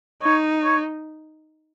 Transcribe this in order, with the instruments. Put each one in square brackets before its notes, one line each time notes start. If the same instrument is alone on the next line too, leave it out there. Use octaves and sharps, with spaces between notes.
[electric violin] D#4 [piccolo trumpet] C#5
[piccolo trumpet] C#5